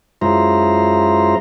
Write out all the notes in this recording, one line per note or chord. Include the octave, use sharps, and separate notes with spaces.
F#2 G#3 E4 F4 C5 A#5